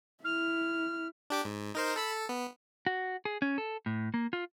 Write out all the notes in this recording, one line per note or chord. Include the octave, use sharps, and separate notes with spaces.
E4 F6
D4 G4 D6
G#2
D#4 A#4 C5
A4 B5 E6
A4
B3
F#4
G#4
C#4
A4
A2
A#3
F4